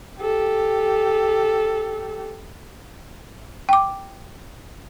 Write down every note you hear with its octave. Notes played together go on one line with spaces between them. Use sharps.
G4 A4
G5 D6